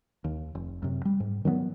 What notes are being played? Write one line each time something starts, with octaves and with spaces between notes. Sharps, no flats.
D#2
F1
F#2 C3
G3
G#2
D#3 F#3 A#3 B3